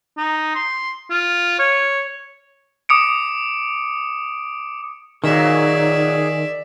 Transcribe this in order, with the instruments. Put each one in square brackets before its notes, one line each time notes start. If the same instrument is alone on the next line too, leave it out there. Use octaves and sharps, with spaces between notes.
[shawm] D#4
C6
F4
C#5
[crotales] D6 D#6 C#7 D7
[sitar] A#2 F#3 [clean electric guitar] D#3 [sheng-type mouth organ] G#4 [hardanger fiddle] D5 E5